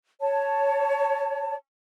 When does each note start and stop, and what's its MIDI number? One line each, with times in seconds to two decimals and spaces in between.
0.21 1.55 73
0.21 1.55 81